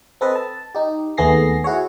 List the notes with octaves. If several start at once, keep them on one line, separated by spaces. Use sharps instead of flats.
C4 A4 B4 D#5
A5
D#4 G4
D#2 A3 B3 G#4 A#6 C7
E4 F#4 G#4 C#5